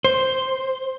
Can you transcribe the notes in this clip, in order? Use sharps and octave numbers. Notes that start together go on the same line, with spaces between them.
C5